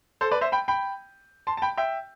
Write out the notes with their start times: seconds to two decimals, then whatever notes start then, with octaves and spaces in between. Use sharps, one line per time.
0.21 A4 C5
0.31 B4 D5
0.41 C5 E5
0.52 G5 B5
0.68 G5 B5
1.47 A5 C6
1.57 A5
1.62 G5 B5
1.77 E5 G5